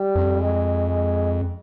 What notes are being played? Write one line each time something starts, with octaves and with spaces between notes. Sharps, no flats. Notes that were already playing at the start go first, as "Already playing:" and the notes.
Already playing: G3
F2
G#3
G#3